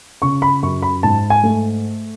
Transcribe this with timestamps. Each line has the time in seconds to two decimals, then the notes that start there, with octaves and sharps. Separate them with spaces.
0.22 C#3 C#6
0.42 B5
0.63 F#2 C#6
0.82 B5
1.03 G#2 A5
1.30 G#5
1.43 A3